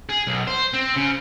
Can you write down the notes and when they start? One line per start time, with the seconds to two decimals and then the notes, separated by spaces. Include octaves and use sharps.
0.09 G#4
0.27 B1
0.47 C5
0.74 C4
0.96 C#3